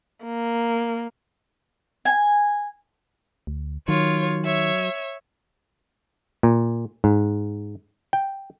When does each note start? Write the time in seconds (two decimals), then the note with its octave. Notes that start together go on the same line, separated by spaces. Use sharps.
0.24 A#3
2.05 G#5
3.47 D2
3.88 D#3 F#3 F4 C#5
4.45 C#5 E5
6.43 A#2
7.04 G#2
8.13 G5